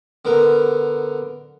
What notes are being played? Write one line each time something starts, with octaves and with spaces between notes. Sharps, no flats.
D3 B3 A#4